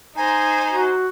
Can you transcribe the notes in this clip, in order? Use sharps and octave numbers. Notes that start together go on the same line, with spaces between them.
D#4 C5 G#5 A#5
F#4